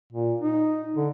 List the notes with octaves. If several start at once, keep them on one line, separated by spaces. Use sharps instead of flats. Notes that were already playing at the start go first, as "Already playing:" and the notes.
A#2
D#4
D3